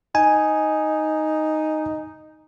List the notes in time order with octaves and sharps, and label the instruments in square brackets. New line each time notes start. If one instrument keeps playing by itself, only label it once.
[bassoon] D#4 [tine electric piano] G#5